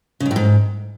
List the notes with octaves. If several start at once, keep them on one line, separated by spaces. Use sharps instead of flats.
C#3
G#2
A2
G#2